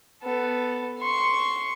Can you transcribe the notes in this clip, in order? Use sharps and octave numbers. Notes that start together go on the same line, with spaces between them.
B3 A4
C6 C#6